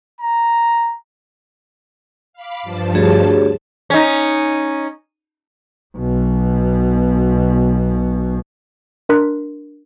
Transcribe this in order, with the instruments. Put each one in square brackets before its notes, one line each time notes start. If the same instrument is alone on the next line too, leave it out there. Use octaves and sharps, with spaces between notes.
[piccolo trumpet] A#5
[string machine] F5 B5 D6
G2 F3 A5
[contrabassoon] D2 [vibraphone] G4 G#4 C#5
[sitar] C#4 D#4
[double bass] B1 B2
[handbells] D4 A#4 C6 F#6 B6